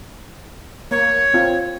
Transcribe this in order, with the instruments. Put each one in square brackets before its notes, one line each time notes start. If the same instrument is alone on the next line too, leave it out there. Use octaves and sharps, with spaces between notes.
[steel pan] A#3 [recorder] C#5
[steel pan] C4 F4